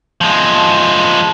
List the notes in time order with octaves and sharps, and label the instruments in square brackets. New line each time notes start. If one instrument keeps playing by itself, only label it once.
[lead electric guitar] F3 G#3